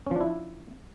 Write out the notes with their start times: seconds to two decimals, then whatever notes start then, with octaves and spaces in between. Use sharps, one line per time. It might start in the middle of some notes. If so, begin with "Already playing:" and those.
0.07 C#4
0.11 F3
0.16 D4
0.21 E4